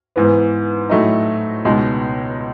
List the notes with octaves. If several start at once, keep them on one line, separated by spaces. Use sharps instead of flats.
G#2 E3 B3
A2 F#3 A3 D#4
C#2 B2 G#3 D#4